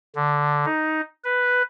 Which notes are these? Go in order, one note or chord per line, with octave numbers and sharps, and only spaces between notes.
D3
D#4
B4